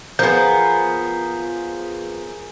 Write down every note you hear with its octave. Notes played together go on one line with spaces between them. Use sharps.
F3 B3 G#4 A#4 G6